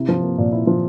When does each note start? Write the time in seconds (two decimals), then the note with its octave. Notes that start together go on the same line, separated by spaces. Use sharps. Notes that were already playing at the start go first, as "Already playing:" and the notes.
Already playing: C3 E4
0.08 F3
0.23 A#3
0.38 A#2
0.52 E4
0.67 F3